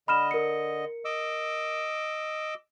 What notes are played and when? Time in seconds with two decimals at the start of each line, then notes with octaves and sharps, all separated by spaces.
0.08 D3 D#5 B5 F6 E7
0.31 A#4 C#7
1.05 D#5 D6 E6